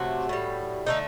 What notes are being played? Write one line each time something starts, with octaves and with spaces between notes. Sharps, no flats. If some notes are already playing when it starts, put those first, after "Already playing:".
Already playing: C3 F#3 A3 F#4
A2 G3
D3 F#3 A3 D#4